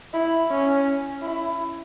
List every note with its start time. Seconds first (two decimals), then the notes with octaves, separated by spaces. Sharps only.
0.14 E4
0.50 C#4
1.22 E4